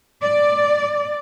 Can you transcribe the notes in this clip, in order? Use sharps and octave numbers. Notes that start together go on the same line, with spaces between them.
D5